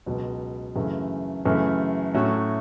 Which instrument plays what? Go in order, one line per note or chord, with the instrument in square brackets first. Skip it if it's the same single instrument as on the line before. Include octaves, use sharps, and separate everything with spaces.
[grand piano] C#2 B2 F#3
F#2 C#3 E3 A3
F#2 C#3 E3 A3
A2 F#3 A3 C#4 F#4